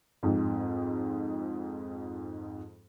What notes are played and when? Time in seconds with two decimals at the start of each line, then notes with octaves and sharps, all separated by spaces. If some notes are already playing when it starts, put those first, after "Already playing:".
0.23 F2 G#2